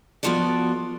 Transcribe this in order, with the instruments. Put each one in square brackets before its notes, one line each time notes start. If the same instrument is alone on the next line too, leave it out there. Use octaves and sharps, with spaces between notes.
[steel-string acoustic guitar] F3 B3 F4 F#4 A4 D5